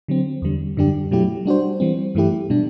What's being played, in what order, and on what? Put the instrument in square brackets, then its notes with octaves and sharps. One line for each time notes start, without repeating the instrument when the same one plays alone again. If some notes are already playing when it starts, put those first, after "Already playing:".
[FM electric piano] D3 F#3 C4
E2 D3 G3
F#2 D3 G3 D4 G4
B2 F#3 A3 E4 G4
G3 D4 F#4 C5
E3 G3 C4
G2 E3 A3 E4 G4
B2 G3 D4